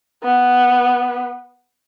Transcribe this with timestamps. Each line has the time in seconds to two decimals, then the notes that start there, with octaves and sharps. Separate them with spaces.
0.24 B3